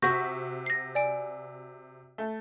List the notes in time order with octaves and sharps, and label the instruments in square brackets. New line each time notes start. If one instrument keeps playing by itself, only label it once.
[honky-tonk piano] C3 F#4 B6 [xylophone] C#6 G6 A#6
[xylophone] A#6 C7
D5 G#5 D7
[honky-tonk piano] A3